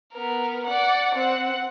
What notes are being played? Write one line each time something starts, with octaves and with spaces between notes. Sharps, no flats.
B3 A#4
D5 F#5
C4 F#5